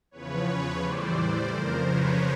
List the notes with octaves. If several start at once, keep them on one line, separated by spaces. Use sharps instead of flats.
E2 C#3 F3 B4 C#5
B4 C#5
A2 E3 G3 C5 D5
F2 C#3 F3 A#4 C5
B4 C#5